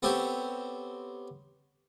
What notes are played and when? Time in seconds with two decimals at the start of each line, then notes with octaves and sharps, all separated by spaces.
0.03 B3 C4 G4 A4 C5 C#5